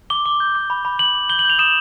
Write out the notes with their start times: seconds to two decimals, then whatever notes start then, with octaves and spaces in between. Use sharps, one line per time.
0.10 D6 G7
0.26 D6
0.40 G6
0.55 D6
0.70 B5
0.85 B5
0.99 B5 F#7
1.15 D6
1.29 G6 G7
1.39 F#7
1.45 G6 F7
1.59 D#6 E7